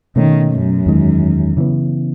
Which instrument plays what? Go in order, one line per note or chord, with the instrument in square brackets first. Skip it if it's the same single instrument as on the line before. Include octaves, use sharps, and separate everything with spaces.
[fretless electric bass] B2 A3 C#4 [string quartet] D#3
[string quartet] F#2
[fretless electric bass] E2 D#3 G#3
C#3 E3 B3